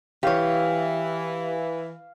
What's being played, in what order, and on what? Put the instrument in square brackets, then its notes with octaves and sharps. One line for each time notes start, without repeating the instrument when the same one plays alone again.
[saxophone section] E3 [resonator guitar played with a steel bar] G4 C#5 [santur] F5